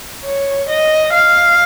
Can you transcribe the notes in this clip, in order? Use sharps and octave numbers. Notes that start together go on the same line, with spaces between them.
C#5
D#5
F5